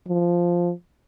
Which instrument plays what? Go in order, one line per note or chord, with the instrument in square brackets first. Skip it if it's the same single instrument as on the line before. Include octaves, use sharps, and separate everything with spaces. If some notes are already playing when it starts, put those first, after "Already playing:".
[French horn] F3